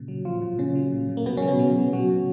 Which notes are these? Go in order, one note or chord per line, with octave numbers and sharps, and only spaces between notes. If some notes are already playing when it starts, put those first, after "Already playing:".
Already playing: A#2 C#3
F#3
A#2 F3 F4
A#2
A#2 C#3 C#4
F#3
A#2
A#2
A#3
B2 F#3 B3
C#3 C#4
F#3
B2 B3
F#3
F#3
B2 F#3 F#4
B2